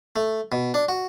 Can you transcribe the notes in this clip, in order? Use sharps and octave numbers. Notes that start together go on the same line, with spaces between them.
A3
B2
D4
F#4